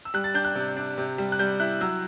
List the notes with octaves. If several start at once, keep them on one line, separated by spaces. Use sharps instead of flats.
E6
G3 F#6
A6
D4 G6
F#6
C3
D4
C3
G3
F#6
G3 G6
E4 F#6
F#3 E6